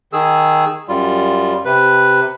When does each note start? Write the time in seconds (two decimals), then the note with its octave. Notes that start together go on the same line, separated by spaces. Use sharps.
0.13 D#3 G#4 E6
0.89 F#2 G3 F4
1.65 C3 B4